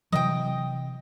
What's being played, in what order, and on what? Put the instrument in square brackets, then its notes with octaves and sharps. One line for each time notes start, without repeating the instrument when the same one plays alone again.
[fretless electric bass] C3 E3 F#3 [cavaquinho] D#5 G5